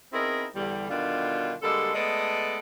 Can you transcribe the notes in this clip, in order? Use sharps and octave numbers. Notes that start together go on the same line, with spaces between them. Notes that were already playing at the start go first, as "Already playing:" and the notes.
B3 C4 D#4 E4 G#4 A#4
E2 D3 G3
B2 D3 D#3 G3 D4 F4
D3 G3 G#3 A#3 A4
G#3 A3 B3 A4 D5 D#5